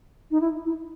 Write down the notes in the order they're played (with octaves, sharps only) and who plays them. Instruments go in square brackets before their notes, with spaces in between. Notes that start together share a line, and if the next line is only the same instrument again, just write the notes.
[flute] D#4
E4
E4